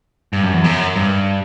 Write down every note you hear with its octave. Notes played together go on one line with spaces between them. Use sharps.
G2
F#2
E2
F#2
G2